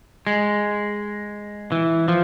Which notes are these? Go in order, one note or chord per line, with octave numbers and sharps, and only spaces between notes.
G#3
E3
F3